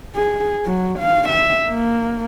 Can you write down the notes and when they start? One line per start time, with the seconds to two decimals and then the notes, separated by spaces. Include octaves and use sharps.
0.15 G#4
0.66 F#3
0.99 F5
1.29 E5
1.69 A#3